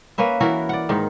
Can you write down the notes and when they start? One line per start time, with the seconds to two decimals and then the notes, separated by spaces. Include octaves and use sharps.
0.18 A#3 C#4 B4 E5
0.40 E3 E4 F#4 A#4
0.69 D5 F#5
0.89 G#2 D#3 D#4